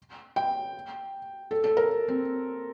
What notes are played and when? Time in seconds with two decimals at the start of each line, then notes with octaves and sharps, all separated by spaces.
0.36 G5
1.51 A4
1.64 A4
1.77 A#4
2.08 C4